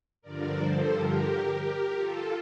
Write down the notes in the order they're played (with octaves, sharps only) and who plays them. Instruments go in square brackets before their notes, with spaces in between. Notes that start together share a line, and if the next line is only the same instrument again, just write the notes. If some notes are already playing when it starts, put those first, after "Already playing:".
[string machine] G2 D3 F3 A#4 D5
A4 C5
G4 A#4
G4 A#4
F4 A4